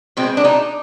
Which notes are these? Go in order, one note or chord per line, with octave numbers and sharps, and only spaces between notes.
B2 G#3 C4
D4
D#4